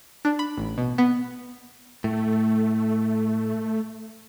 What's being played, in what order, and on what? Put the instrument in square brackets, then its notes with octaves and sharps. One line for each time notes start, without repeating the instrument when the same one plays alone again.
[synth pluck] D4
B5
A1
B2
B3
[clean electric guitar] A2 [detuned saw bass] A3